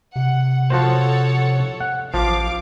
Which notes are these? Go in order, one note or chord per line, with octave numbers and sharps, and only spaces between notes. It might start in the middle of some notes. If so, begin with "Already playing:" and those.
C3 F#5
F3 F#4 A4 C5 C#5 F#5
F#5
A1 F3 F5 D6